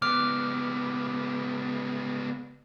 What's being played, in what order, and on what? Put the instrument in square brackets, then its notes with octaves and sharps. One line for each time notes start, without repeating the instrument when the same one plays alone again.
[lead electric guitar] C#2 B3 [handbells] D6 F6